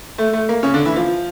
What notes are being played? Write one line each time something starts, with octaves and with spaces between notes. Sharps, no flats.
A3
A3
A#3
C#3 C#4
D3 D4
E3 E4
F3 F4